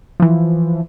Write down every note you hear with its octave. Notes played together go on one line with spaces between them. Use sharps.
E3 F3